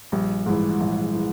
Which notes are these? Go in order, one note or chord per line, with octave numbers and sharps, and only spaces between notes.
A#1 G3
G#2 E3 G#3
A#1
E3